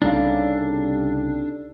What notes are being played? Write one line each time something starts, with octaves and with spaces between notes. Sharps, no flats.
C2 C#3 G3 D4 D#4 A4 F5